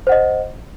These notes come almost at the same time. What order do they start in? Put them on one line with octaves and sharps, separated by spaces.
C5 F#5 D#5